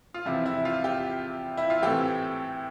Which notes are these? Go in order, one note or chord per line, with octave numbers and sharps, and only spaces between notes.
F4
E2 C3 F3 C4 E4
E4
F4
G4
E4
F4
A2 E3 A3 C4 G4